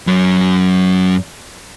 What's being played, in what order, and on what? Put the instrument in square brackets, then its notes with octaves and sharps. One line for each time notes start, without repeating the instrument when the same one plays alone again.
[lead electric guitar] F#2 F#3